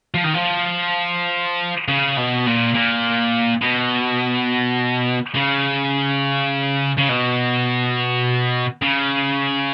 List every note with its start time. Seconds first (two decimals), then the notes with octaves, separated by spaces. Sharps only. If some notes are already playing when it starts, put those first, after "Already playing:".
0.14 F3
0.24 D#3
0.34 F3
1.88 C#3
2.17 B2
2.46 A#2
2.75 A#2
3.62 B2
5.35 C#3
6.98 C#3
7.09 B2
8.82 C#3